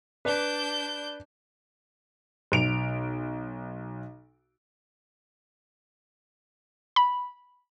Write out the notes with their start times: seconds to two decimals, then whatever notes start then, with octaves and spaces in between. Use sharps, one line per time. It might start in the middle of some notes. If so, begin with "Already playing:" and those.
0.25 D4 B4 D5 G6
2.52 B1 D7 F7
6.96 B5